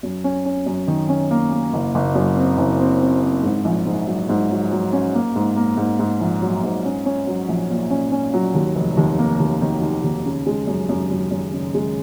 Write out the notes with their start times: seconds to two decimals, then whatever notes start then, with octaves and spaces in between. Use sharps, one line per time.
0.03 F#2
0.24 C#4
0.45 C#4
0.66 F#2
0.87 D#3
1.09 C#4
1.31 A#3
1.52 A#3
1.73 F#1
1.95 F#1
2.15 F#2
2.37 C4
2.58 F#1
2.80 C4
3.01 C4
3.22 C4
3.43 G#2
3.65 A#1
3.86 G#2
4.07 F#3
4.29 G#2
4.50 F#3
4.71 F#3
4.93 C#4
5.14 A#3
5.36 G#2
5.56 A#3
5.77 G#2
5.99 G#2
6.21 A#1
6.42 F#3
6.64 G#2
6.85 C#4
7.06 C#4
7.27 F#3
7.49 A#1
7.70 A#2
7.91 C#4
8.12 C#4
8.33 F#3
8.54 D#2
8.76 F1
8.97 D#2
9.19 A#3
9.40 D#2
9.61 D#3
9.82 D#2
10.04 D#2
10.26 C#3
10.46 G#3
10.67 F#2
10.89 F#2
11.11 F#2
11.31 F#2
11.53 C#3
11.74 G#3